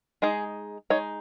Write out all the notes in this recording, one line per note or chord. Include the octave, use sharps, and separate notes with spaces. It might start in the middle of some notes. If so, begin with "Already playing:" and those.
G#3 D#4 G#4
G#3 D#4 C#5